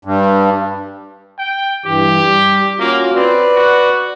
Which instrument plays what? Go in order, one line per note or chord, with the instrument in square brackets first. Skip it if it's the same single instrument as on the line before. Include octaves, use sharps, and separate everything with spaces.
[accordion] G2
[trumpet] G5
[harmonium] G2 E3 [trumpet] G4
[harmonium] G3
[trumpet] A#3 [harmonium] C#4 F4 F#4
[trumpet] C4 [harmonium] B4 D5
[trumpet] F#4